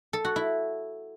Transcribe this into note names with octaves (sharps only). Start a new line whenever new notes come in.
A4
F#4
E4